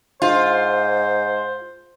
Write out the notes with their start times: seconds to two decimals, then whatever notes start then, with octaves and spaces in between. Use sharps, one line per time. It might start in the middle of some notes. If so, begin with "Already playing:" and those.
0.22 G#2 F4 C5